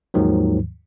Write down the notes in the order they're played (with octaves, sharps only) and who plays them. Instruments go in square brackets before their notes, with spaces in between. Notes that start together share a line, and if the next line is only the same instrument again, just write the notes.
[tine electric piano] D#2 G#2 D#3 F3 F#3